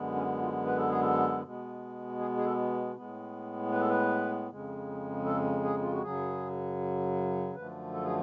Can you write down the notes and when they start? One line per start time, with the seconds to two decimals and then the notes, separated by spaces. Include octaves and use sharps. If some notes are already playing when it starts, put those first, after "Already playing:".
Already playing: F#2 D3 G#3 B3
0.15 C#4
0.41 F4
0.66 B4
0.78 A4
0.89 G#4
1.01 A4
1.43 B2 G#3 B3
2.19 G#4
2.37 G#4
2.45 A4
2.96 A2 G#3 B3
3.72 B4
3.81 A4
3.89 B4
4.50 F2 C#3 G#3
5.25 A4
5.64 G#4
5.81 F4
5.92 F#4
6.02 F#2 C#3 F#3 G#4
7.55 F#2 D3 F3 A3 B4
7.93 A4
8.04 G#4